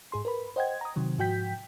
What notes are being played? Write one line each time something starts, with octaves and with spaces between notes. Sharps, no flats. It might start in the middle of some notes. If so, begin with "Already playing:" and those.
G#2 G#4 C6
A#4 B4 B5
C5 D#5 F#5 G5 G#6
A#5 D#6
C3 D#3 F#3
G#2 F3 F#4 G5 G6 B6